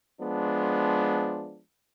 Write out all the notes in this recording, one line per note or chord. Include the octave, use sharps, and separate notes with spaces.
F3 G#3 B3 D4